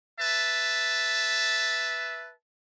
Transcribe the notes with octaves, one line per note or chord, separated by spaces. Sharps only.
B4 E5 A5